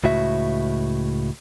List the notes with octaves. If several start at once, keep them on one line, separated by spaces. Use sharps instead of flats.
C#2 A2 F#4 E5